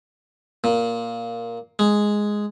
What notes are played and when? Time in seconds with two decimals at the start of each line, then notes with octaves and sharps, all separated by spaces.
0.64 A#2
1.79 G#3